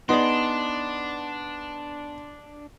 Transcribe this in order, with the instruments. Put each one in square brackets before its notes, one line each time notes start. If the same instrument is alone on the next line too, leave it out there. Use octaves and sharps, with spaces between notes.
[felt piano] B3 [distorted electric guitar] D4 [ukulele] D#4 G#4 D5 [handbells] C6